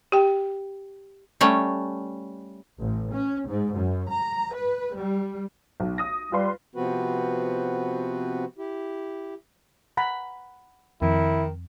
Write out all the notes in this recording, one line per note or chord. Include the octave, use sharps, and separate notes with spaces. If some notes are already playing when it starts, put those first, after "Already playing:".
G4 G5
G3 A3 C#4
A1
C#4
G#2
F#2
A#5
B4
G3
B1
D#6 A#6
G3 F4 B4 C6
C3 F3 B3 C4 F#4 B4
E4 G4
F#5 A#5 B5
F2 D#3 E4